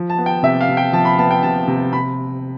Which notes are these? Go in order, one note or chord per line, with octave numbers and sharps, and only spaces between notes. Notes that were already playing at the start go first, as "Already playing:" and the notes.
Already playing: F3
A5
B3
G5
C3 E5
F5
C3
G5
F3 A5
B5
B3 A5
G5
C3 A5
C3
C3 B5